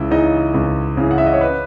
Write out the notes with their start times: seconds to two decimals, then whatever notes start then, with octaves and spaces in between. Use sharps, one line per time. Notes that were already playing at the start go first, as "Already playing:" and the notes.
Already playing: C#2 E4 E5
0.11 C#3 E3 D#4 D#5
0.54 C#2
0.97 C#3 E3
1.11 F#5
1.18 E5
1.26 D#5
1.33 C#5
1.41 B4